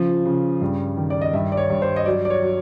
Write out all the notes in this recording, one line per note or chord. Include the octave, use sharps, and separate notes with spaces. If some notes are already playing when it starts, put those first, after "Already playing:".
Already playing: C#3 F3
C#3
G2
D#3
D5
D#5
G2 E5
D5
C#5
G2
C5
D#5
F#3 D5
D5
C#5
F#3